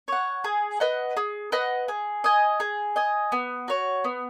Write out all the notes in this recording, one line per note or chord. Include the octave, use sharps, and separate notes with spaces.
C#5 F#5
G#4
B4 D#5 F#5
G#4
B4 D#5 F#5
G#4
D#5 G#5
G#4
D#5 G#5
B3
F#4 C#5
B3